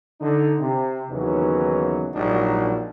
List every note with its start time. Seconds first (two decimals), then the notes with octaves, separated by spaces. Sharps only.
0.20 D3 D#4
0.59 C3
1.10 D#2 C#3 E3 F#3 B3 D#4
2.14 A#1 G#2 F#3 G3 D4 D#4